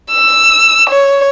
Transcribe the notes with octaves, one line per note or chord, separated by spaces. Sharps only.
E6
C#5